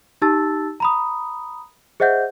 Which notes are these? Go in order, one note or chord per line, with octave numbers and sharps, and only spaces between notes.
D#4 G4 A5 E6 A6
A#5 B5 D#6
G#4 C5 D#5 E5 F#5 G6